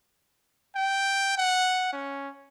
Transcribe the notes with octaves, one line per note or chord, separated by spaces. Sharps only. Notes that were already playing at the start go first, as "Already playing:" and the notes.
G5
F#5
C#4